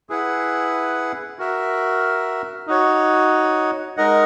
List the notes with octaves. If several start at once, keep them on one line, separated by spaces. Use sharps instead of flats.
E4 G#4 B4 F#5
F#4 A#4 E5
D#4 F#4 C#5
G#3 D#4 A#4 D#5 F#5